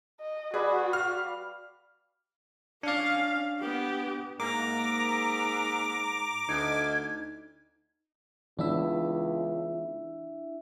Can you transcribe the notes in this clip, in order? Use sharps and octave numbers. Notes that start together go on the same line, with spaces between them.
D#5
G3 F#4 G#4 B4 D5
F5 F6
C#4 D4 D5 F5
B3 G4
G#2 A#3 A#5 D6
D2 D#4 G#6
C#2 E3 B3 D4 E4 E5